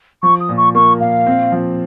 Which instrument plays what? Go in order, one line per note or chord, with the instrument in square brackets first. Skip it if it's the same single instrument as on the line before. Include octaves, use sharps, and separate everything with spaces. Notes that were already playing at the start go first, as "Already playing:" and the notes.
[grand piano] F3 [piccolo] C#6
[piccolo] D#6
[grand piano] A#2
[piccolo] C#6
[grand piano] A#3 [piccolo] C#6
[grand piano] A#2 [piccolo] F5
[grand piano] C4
F3